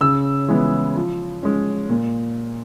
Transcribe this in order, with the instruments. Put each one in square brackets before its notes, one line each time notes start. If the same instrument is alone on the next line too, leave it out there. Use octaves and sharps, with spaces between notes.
[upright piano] C#3 E6
E3 G#3 B3
F3
G#3 C#4
A#2